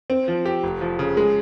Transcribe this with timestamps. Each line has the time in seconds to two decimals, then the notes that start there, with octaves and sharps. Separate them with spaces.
0.10 C4
0.28 F3
0.45 G4
0.63 F1
0.81 F3
0.99 C#3
1.17 G#3